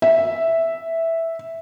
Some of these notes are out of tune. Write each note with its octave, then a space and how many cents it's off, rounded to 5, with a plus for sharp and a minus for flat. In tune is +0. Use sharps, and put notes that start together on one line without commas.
E5 -5